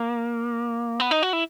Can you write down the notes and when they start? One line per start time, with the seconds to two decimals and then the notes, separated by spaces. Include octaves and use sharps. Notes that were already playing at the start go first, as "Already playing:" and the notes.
Already playing: A#3
1.00 B3
1.11 D#4
1.23 F#4
1.33 E4